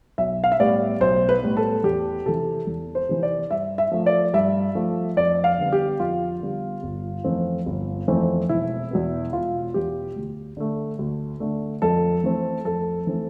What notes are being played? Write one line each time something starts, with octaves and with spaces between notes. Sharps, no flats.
B1 E5
F5
E5
A2 G3 B3 D5
B1 C5
B4
A2 G3 B3
A4
E2 G4
C3 E3 A4
E2
C5
C3 E3
D5
G2 E5
E5
F3 A3
D5
G2 E5
F3 A3
F2 D5
F5
D3 G3 B3
G4
F2 F4
D3 G3 B3
G1
F2 E3 A3 C4
G1
F2 E3 A3 C4
E1 E4
E2 B2 B3
E1 F4
E2 B2 B3 G4
D2
D3 A3
D2
D3 A3
F2 A4
E3 A3 C4
F2 A4
E3 A3 C4